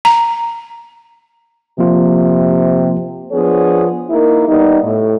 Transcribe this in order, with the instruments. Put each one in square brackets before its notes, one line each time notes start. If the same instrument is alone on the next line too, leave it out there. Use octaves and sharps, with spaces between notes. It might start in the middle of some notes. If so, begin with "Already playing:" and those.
[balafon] A#5
[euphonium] C3 [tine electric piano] F3 A#3 F4
[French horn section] F3 B3 D4 G#4 C#5
A#3 D#4 E4
G3 B3 D#4
A2